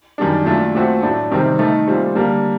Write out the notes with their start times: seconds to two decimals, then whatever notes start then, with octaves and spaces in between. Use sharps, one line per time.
0.18 F#2 D#3 G3 D4
0.46 A#2 F#3 A3 D4
0.75 A#2 A3 C4 F#4
1.02 A2 F#3 A3 D4
1.30 C3 D#3 G3 C4
1.59 D#3 A3 D#4
1.88 A#2 G3 C4
2.15 D3 G3 A#3